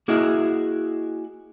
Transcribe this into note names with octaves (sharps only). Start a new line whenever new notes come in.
A#3 E4 F#4 G#4 D#5 E5